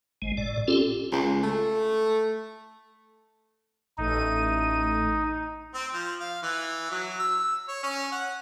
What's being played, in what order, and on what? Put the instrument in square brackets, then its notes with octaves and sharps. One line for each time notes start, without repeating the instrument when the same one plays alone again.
[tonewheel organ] G#1 G#3
A2 D5
C4 C#4 F4 G4 A4
[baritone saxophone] C#2
A3
[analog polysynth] A1 A3 D#7 [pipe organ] D#4
[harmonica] C4
F3
F5
E3
F#3
E6
C#5
C#4
F#5